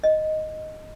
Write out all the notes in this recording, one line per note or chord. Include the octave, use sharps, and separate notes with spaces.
D#5